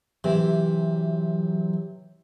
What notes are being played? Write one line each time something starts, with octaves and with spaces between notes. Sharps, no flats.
C3 E3 F#3 E5